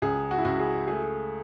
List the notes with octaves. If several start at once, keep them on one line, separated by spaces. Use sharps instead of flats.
C#2 G#4
F#4
E4
C#2 F#4
G#4
A3 G#4